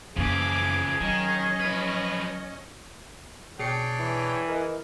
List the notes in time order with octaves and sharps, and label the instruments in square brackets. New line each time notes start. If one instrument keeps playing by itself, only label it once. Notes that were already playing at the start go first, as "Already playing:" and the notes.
[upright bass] F#2 A#3 [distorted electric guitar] C#3 F3 [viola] E3 D6 [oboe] G#4
[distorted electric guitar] D#3 [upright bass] F#3 [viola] C#4 D#5
[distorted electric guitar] F3 B4
[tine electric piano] B2 [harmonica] D4 C#5 G5 [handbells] G#4 C7 C#7
[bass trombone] E3
[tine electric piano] A#4 D#5